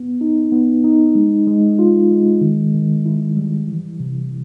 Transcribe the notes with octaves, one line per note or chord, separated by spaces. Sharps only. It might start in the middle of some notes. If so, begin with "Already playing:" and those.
Already playing: B3
D#4
B3
D#4
G#3
G#3
F4
G#3
D#3
D#3
E4
G3
E3
C3